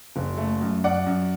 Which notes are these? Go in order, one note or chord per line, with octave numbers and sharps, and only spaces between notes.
F#1
A3
F#2
F#2 D5 F#5
F#2